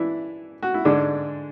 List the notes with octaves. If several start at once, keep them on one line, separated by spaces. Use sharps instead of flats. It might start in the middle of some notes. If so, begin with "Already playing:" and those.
Already playing: E3 D4 E4
F#4
E4
G#2 D3 G#3 D4